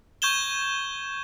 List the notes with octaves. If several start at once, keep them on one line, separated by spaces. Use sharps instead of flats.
C#6 G6 G#6 E7 G7